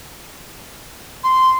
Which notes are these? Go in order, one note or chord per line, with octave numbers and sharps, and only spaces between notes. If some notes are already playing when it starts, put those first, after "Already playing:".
C6